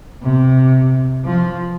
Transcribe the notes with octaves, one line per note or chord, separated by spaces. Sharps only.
C3
F3